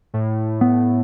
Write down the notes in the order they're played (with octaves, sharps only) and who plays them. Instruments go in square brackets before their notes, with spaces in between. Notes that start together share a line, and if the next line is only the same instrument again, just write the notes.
[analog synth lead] A2
[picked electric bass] B3